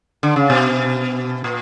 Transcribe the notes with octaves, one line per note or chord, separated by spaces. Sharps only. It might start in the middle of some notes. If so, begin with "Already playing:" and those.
D3
C#3
B2
A#2